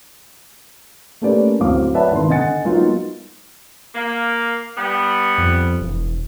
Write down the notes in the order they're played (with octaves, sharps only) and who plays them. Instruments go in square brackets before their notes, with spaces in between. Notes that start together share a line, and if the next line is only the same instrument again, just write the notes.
[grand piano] A3 A#3 C#4 G4 B4 D5
D1 F#3 C4 F5 D6
B4 C#5 D5 E5 F#5 A5
G#1 D#3 B3 C6
D3 D#5 F#5 G#5 A6 C#7
F#3 G#3 A#3 B3 D#4 F4
[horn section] A#3
G3 B3
[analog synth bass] F2
E1